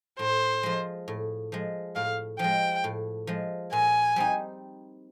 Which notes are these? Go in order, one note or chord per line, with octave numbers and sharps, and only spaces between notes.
A2 C5
F3 G#3
A2
F3 G#3
A2 F5
F3 G#3 G5
A2
F3 G#3
A#2 G#5
G3 C4 D#4